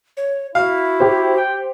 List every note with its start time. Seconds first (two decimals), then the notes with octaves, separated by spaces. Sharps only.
0.17 C#5
0.55 E4 F#4 F5
1.00 G4 C5
1.36 G5